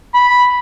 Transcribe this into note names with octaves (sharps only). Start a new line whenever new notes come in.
B5